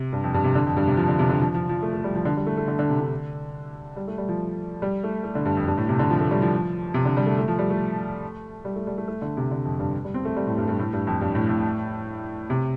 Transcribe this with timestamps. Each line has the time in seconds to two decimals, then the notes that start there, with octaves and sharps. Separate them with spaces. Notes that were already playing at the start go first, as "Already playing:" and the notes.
Already playing: C3
0.13 G2
0.24 F2
0.34 G2
0.44 C3
0.55 D3
0.66 F2
0.77 G2
0.87 C3
0.97 F3
1.08 D3
1.19 C3
1.29 D3
1.40 F3
1.55 F3
1.69 F3
1.82 A3
1.94 A3
2.04 G3
2.15 F3
2.25 D3
2.37 G3
2.46 A3
2.57 A3
2.68 D3
2.79 D3
2.89 C3
3.00 D3
3.96 G3
4.08 A3
4.18 G3
4.29 F3
4.82 G3
5.04 A3
5.24 A3
5.35 D3
5.45 G2
5.57 F2
5.67 G2
5.77 A2
5.89 C3
5.99 D3
6.10 F3
6.20 A3
6.31 G3
6.42 F3
6.94 C3
7.05 D3
7.17 G3
7.26 A3
7.38 A3
7.48 F3
7.59 G3
7.70 A3
8.65 G3
8.76 A3
8.87 G3
8.98 A3
9.08 A3
9.22 D3
9.37 C3
9.51 D3
9.65 F2
9.79 G2
10.05 G3
10.14 C4
10.25 A3
10.37 G3
10.47 A2
10.58 G2
10.68 G2
10.79 A2
10.93 G2
11.07 F2
11.21 G2
11.35 A2
11.49 A2
12.50 C3